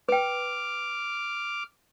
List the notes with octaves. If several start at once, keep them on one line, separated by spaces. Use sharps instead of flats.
B4 G5 D6 F6